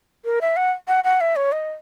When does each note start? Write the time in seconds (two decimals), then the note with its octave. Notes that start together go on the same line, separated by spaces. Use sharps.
0.25 A#4
0.41 E5
0.56 F#5
0.88 F#5
1.04 F#5
1.21 E5
1.36 C#5
1.52 D#5